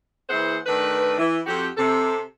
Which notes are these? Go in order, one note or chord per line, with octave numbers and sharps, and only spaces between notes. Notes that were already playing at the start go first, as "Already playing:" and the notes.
E3 A#3 E4 G#4 C5 F#5
D#3 A3 D4 B4
E3
F2 F#4 G4
C3 A4